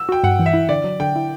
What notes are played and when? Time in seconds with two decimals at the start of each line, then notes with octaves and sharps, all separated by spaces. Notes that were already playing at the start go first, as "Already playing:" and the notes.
Already playing: E6
0.09 F#4 G5
0.23 G2 F#5
0.39 E3
0.46 E5
0.54 E4
0.69 D3 D5
0.84 F#3
1.00 D3 G5
1.16 E4